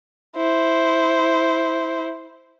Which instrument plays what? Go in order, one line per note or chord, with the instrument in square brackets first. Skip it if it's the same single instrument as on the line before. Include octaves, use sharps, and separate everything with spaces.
[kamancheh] E4 C5